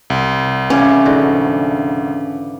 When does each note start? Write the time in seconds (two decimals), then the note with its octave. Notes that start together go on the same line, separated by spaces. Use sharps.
0.10 C2
0.70 C#3 E3 C#4 D5
1.05 G#2 D3 F#4